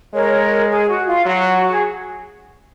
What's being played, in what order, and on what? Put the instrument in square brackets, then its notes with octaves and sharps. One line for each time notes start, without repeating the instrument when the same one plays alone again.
[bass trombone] G#3 [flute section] A#4 C#5
[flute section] G#4
F#4
F4
[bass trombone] F#3 [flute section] F#4
[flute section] G#4